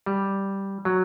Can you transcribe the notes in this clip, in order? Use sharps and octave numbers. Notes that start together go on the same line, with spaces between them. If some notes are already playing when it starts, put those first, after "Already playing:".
G3
F#3